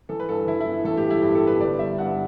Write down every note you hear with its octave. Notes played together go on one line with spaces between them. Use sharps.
E3 A4
B4
G2 A4
E3 E4
E4
B3
A1 A4
G4
G2
E4
G2 G4
A4
B3
B4
G1 D5
G3 E5
G2 F#5